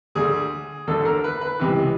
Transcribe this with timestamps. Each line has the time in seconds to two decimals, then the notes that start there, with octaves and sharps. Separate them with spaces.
0.15 D2 D3 G#4
0.87 D2 D3 A4
1.05 A#4
1.24 B4
1.41 B4
1.59 C#2 C3 E3